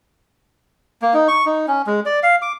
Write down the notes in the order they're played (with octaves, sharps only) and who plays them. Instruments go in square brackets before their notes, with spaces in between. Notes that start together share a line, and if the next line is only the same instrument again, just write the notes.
[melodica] A#3
D#4
C#6
D#4
C#4
G#3
D5
F5
D6